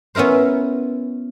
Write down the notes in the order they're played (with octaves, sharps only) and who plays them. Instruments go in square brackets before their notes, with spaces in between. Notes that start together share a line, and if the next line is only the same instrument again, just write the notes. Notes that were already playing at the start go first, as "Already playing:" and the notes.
[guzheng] B3 C#4 E4 A#4 C5